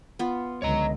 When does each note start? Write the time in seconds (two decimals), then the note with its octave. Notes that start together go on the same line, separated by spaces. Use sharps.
0.19 B3 F4
0.62 C#2 D3 C#5 D#5 A#5